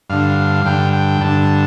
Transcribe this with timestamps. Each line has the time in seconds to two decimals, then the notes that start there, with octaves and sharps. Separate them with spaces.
0.10 G2 D3 F5
0.65 G2 D3 G5
0.93 G5
1.21 G2 D3 A5